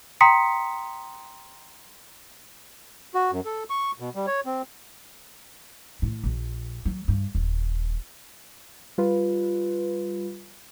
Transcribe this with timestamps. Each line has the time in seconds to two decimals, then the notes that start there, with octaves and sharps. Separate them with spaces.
0.21 G5 A#5 C6 D#6 B6 C#7
3.14 F#4
3.31 F#2
3.45 A4
3.70 C#6
4.00 B2
4.15 G3
4.27 C#5
4.46 C4
6.02 A2
6.24 A#1
6.85 F#3
7.08 G2
7.35 D#1
8.98 G3 F4 B4